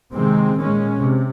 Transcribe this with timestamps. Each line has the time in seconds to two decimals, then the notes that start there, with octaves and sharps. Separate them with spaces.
0.13 C3 D#3 G#3 C4
0.57 A#2 G#3 C#4
1.02 C3